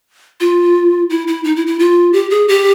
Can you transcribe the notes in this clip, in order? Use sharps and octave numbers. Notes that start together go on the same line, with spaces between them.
F4
E4
E4
D#4
E4
E4
F4
G4
G#4
G4